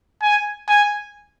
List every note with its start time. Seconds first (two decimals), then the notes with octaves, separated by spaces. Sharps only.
0.23 G#5
0.69 G#5